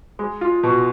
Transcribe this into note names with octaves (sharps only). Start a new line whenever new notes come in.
G#3
F4
B2